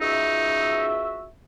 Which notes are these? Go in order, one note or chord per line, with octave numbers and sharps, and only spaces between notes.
C#2 D#4 F#4 E5